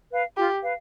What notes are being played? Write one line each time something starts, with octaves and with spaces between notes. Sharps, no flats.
B4 F5
F4 G4
B4 F5